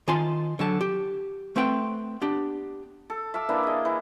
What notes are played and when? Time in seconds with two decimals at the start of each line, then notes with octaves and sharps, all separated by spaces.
0.08 D#3 F4 G#5 A5 C6
0.59 D3 F#3 A5
0.81 G4
1.56 A3 C4 B4 F#5 G5
2.21 B3 D4 G4
3.10 A4
3.34 E5 F5 A5 D6
3.49 E3 A#3 D4
3.63 G#4 D#5
3.85 E3